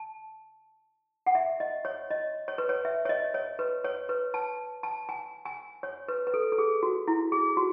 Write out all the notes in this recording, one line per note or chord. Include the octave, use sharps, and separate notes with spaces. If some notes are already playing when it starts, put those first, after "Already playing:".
Already playing: A5
F#5
E5
D#5
C#5
D#5
C#5
B4
C#5
E5
C#5
D#5
C#5
B4
C#5
B4
A5
A5
G#5
G#5
C#5
B4
B4
A4
A4
G#4
F#4
E4
G#4
F#4